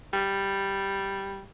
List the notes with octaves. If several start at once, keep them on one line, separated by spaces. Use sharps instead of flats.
G3